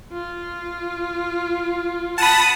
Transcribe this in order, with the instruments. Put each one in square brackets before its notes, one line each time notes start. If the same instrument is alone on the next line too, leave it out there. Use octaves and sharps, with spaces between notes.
[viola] F4
[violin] F#5 D#6 [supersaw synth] A5 B5